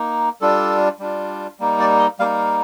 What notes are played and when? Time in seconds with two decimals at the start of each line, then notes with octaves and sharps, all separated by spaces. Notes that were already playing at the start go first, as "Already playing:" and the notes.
Already playing: A#3 D#4
0.41 G3 D4 F4 A4
1.00 G3 D4 F4
1.60 G3 A#3 D#4
1.79 D5
1.99 D#5
2.19 G3 A#3 D#4 F5